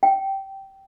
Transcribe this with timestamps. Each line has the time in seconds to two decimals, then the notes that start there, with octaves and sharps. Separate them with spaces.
0.03 G5